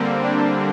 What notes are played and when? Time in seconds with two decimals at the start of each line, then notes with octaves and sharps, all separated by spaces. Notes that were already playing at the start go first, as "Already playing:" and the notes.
Already playing: D3 G3 A#3 C4
0.24 D4